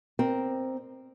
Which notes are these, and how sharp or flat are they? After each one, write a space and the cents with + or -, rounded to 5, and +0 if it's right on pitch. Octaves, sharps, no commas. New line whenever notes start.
C4 +0 A#4 +0 D5 +45